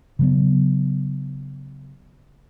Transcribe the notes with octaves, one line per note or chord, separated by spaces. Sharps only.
C#3 F#3 B3